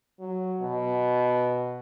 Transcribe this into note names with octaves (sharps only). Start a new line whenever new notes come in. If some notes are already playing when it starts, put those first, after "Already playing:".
F#3
B2